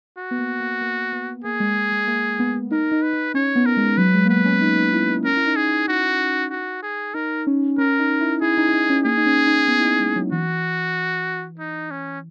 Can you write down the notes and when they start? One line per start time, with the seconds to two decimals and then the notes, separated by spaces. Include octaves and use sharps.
0.18 F#4
0.31 B3
0.38 A#3
0.60 A#3
0.81 A#3
1.13 B3
1.44 A#3 G#4
1.60 G#3
1.76 G#3
1.91 G#3
2.07 A#3
2.39 B3
2.71 D#4 A#4
2.92 D#4
3.02 B4
3.13 D#4
3.34 C#4 C#5
3.56 B3
3.66 A#4
3.77 G#3
3.98 F#3 B4
4.14 G#3
4.25 A#3
4.30 B3 B4
4.45 C#4
4.61 D#4
4.77 D#4
4.93 E4
5.09 D#4
5.25 C#4 A#4
5.37 E4
5.46 D#4
5.56 G#4
5.67 E4
5.88 D#4 F#4
6.51 F#4
6.83 G#4
7.14 D#4 A#4
7.47 C#4
7.78 C#4 A#4
7.99 D#4
8.20 E4
8.41 E4 G#4
8.58 D#4
8.69 E4
8.73 D#4
8.89 C#4
9.05 A#3 G#4
9.17 D#4
9.26 C#4
9.47 D#4
9.68 B3
9.79 E4
9.84 D#4
10.00 G#3
10.16 F#3
10.32 E3 F#4
11.59 D#4
11.91 C#4